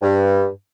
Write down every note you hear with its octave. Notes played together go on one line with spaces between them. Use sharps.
G2